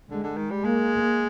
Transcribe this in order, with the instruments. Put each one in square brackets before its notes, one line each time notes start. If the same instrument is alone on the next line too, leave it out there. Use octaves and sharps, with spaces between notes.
[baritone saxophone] D3 [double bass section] G#3
[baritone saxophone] D3
D#3
G3
[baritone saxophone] G#3 [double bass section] A#3